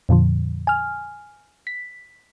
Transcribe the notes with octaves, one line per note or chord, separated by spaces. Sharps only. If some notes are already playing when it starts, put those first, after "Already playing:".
F2 A#2 D3 F3
G#5 F6
B6